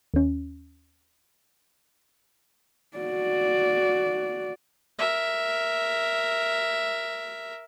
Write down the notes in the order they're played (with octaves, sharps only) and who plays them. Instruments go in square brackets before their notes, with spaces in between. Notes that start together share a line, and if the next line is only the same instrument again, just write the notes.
[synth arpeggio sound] D#2 C#4
[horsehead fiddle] F#4 D5
[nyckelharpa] A#4 E5